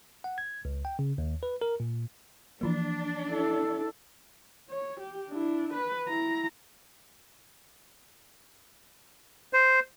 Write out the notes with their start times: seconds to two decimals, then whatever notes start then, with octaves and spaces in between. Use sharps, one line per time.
0.24 F#5
0.38 G#6
0.65 C#2
0.85 G5
0.99 C#3
1.18 D#2
1.43 B4
1.62 A#4
1.80 A#2
2.61 E3 F3 A#3 D4
3.28 E4 A4
4.70 C#5
5.00 G4
5.30 D4 E4
5.73 B4
6.09 E4 A#5
9.53 C5